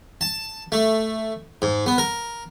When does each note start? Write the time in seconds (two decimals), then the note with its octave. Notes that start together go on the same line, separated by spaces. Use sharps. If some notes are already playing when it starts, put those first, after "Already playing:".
0.21 A5
0.72 A3
1.62 G#2
1.86 B3
1.98 A#4